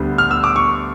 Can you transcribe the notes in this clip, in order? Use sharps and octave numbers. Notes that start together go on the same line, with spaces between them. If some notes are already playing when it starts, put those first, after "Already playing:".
Already playing: D2 D3 G3 B3
F6
E6
D6
C#6